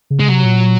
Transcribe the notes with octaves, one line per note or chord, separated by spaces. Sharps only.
C#3
G#3
C3 F#3
A#2